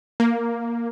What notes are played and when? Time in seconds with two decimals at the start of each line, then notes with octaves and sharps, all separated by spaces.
0.20 A#3